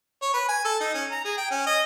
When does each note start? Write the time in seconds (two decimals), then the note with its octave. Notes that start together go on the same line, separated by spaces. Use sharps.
0.22 C#5
0.34 B4
0.48 G#5
0.65 A4
0.81 D#4
0.94 C#4
1.11 A#5
1.25 G#4
1.38 G5
1.51 C#4
1.67 D#5